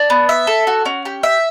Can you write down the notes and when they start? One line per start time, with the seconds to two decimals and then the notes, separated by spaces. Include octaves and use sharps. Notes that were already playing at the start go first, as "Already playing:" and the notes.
Already playing: D4
0.10 B3
0.29 E5
0.47 A4
0.67 F#4
0.85 C#4
1.05 G4
1.23 E5